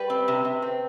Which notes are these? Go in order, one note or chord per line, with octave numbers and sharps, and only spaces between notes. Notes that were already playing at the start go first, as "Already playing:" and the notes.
Already playing: G3 B4
C4
C3
C3
C4